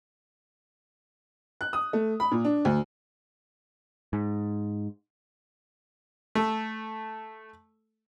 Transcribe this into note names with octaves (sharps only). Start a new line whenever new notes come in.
F#6
D#6
A3
B5
A#2
D4
D2
G#2
A3 A4